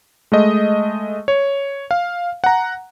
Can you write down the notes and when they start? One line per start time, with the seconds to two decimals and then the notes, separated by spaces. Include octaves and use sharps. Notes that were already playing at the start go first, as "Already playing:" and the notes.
0.32 G#3 A3 D#5
1.28 C#5
1.91 F5
2.44 F#5 A#5